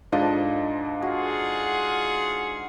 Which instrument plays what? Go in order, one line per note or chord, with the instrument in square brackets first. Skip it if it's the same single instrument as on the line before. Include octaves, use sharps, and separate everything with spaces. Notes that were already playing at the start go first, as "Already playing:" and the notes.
[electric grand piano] G#2 D4 D#5 [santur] F3 A4
[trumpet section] F4 G#4 F#5 [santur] F#4